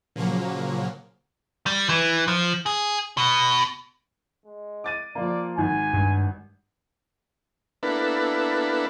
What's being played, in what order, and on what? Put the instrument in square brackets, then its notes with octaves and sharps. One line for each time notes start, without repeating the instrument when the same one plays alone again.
[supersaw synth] A#2 C#3 F3 F#3 A#3
[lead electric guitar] G3
E3
F3
G#4
B2
[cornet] G#3
[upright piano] D6 A6 D#7
[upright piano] F3 A#3 [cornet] D5
[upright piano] G#1 [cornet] G#5
[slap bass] G2
[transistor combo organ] A#3 B3 D4 E4 A4 B4